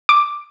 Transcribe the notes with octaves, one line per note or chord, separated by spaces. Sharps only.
D6